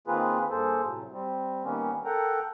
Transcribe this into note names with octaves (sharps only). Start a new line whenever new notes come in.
D#3 A#3 C4 F4 G#4 B4
G2 A#3 G#4 A4 C5
A2 C3 F#3
G3 C4
D#3 G3 A#3 B3 C#4
A4 A#4 F#5 G5 A#5